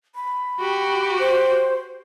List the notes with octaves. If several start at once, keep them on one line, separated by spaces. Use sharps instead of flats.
B5
F#4 G4
C5